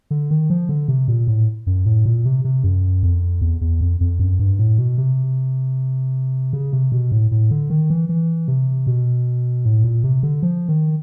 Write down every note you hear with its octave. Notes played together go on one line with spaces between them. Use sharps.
D3
D#3
F3
D3
C3
A#2
A2
F#2
A2
A#2
C3
C3
F#2
F2
E2
E2
F2
F2
F#2
G2
A2
B2
C3
C#3
C3
B2
A2
A2
D3
D#3
E3
E3
C3
B2
A2
A#2
C3
D3
F3
D#3